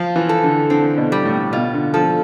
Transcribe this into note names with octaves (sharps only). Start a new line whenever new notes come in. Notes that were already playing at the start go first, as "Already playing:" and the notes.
Already playing: F3 F4
E3
A4
D3
D3 C4
B2
G3
A2
B2 F4
D3
F3 A4